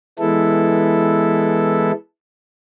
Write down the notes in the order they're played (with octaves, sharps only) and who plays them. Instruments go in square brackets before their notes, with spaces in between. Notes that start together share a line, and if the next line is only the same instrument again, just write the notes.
[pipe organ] E3 G#3 B3 E4 A4